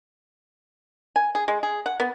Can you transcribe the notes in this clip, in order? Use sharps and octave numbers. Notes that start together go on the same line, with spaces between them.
G#5
G#4
G#3
G#4
F#5
B3